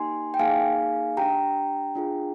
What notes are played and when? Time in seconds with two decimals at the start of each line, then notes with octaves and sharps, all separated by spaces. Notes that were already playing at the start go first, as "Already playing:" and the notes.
Already playing: A#3 D#4 G4 G#5 C6
0.34 G5
0.39 A#3 D#4 G#4 F5 G#5
1.17 D4 G4 G5 A#5
1.95 D4 F4 G#4